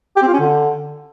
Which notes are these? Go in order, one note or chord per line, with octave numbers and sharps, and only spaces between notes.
G4
C4
F4
C#4
D3